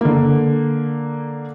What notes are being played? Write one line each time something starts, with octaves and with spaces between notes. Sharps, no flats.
D3 A#3